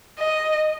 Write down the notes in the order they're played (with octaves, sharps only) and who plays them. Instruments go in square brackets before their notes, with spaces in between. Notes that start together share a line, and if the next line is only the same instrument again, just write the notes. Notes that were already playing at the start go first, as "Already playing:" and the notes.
[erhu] D#5